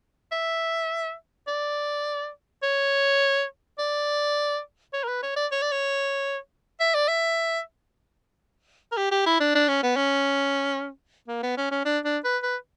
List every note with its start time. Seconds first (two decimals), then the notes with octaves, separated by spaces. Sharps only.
0.32 E5
1.48 D5
2.63 C#5
3.78 D5
4.93 C#5
5.04 A#4
5.08 B4
5.23 C#5
5.36 D5
5.52 C#5
5.62 D5
5.72 C#5
6.80 E5
6.95 D5
7.08 E5
8.92 A#4
8.97 G4
9.11 G4
9.26 E4
9.40 D4
9.55 D4
9.68 C#4
9.83 B3
9.96 C#4
11.28 A#3
11.43 B3
11.57 C#4
11.71 C#4
11.85 D4
12.05 D4
12.24 B4
12.43 B4